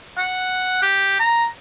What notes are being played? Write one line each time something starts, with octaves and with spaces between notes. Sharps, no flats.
F#5
G4
A#5